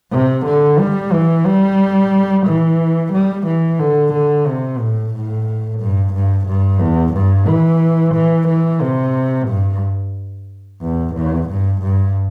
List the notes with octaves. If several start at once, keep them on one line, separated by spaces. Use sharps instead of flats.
C3
D3
G3
E3
G3
E3
G3
E3
D3
D3
C3
A2
A2
G2
G2
G2
E2
G2
E3
E3
E3
C3
G2
E2
E2
G2
G2